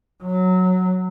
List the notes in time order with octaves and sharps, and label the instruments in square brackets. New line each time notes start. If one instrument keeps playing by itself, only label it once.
[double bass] F#3